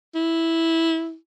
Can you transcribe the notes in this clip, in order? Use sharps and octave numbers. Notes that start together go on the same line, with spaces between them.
E4